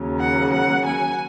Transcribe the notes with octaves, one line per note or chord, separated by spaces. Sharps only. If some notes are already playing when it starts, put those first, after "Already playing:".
Already playing: D#2 C#3 F#3
F#5
F#5
G#5